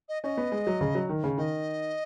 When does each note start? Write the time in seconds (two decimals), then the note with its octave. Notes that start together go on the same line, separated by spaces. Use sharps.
0.09 D#5
0.23 C#4 D#5
0.37 B3
0.52 G#3
0.67 F#3
0.81 C#3
0.95 F#3
1.09 D#3
1.24 C#3
1.38 D#3 D#5